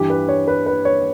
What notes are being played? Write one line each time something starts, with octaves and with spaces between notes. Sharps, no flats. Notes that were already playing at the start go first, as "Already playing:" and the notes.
Already playing: G2 E3 G4
B4
C#5
B4
B4
C#5